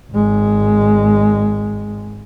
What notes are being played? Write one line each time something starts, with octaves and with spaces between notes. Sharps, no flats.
G#1 G#3